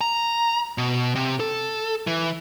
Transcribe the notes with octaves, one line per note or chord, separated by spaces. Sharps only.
A#5
B2
C3
A4
E3